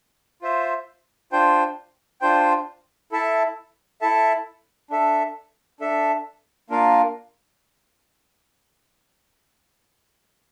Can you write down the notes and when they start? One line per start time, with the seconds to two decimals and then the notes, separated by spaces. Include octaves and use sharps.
0.42 F4 C5 E5
1.32 D4 F4 C5 G5
2.21 D4 F4 C5 G5
3.12 E4 A4 E5 A5
4.01 E4 A4 E5 A5
4.90 D4 A4 E5
5.80 D4 A4 E5
6.70 A#3 D4 F4 A#4 F5